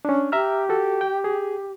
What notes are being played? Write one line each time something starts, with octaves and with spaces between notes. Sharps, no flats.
C#4 D4
G4 E5 A#5 F6
F#4 A4
G5
G#4